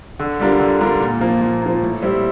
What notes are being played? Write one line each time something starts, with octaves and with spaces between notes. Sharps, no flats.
D3
G3 D4 F4 A#4
D3
G3 D4 F4 A#4
A#2
F3 A#3
A#2
F3 A#3
A2
G3 C4 E4